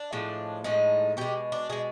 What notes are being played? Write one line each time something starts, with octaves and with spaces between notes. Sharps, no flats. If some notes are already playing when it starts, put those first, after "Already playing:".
Already playing: D4
A2 F3 G#3
A2 F3 G#3 D#4
B2 G#3 G4
D4
B2 G#3 G#4